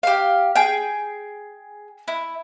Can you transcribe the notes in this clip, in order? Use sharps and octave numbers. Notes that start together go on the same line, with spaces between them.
G4 F5
G#4 G5
E4